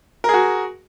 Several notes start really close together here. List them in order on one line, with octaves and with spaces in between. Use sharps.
A#4 G#4 F#4